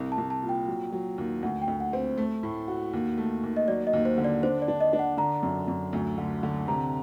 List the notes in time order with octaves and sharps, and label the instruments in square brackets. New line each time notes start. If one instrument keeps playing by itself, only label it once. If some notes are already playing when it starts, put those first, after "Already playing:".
Already playing: [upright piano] C2
[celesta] A5
[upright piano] C2
[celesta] A5
[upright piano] A#2
[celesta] G5
[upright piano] F#3
F#3
D#2
[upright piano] D2 [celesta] F#5
[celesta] G5
[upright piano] D2
[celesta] F#5
[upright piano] C4
A3
A2
F#4
D#2
A3
D#2
[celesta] D#5
[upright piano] F#3 [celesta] D5
[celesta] D#5
[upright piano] D#2
[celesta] C5
[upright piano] D3
[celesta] D5
[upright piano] D4 [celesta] C5
[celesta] D5
[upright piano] D4
[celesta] D#5
[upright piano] D4
[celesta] F#5
[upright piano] D3 [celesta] A#5
[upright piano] F#2
F#2
D2
D3
D3
[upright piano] C3 [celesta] A#5